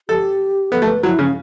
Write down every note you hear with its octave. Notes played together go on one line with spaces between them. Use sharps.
G4 A4
B3 A4
A3
B4
F#3 E4
C#3 C#4